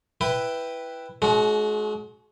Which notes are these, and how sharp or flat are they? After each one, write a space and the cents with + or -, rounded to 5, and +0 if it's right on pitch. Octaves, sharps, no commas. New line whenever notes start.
E4 +5 B4 +0 G5 +0
G#3 +40 D4 -40 F#4 +0